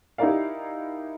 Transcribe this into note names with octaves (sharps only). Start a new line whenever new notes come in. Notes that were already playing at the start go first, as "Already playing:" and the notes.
D#4 E4 G4 A#4 D5 F5